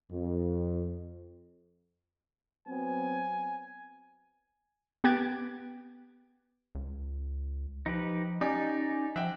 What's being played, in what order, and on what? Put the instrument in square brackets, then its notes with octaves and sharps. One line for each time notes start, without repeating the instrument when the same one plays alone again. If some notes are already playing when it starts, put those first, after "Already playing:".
[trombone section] F2
[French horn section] F#3 B3 C4 [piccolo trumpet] G#5
[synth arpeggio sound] B3 G4 F#6 G#6 A6 D7
[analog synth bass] C#2
[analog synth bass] F3 [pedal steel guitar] D#4 G4 B4
[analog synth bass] C#4 [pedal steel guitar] D#4 [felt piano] G4 D5 G#5
[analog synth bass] F3 [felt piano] E5 G5 [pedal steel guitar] F#5